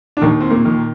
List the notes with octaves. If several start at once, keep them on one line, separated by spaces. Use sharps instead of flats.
D4
D#2 D#3 D#4
C4
A#2 A#3
D#3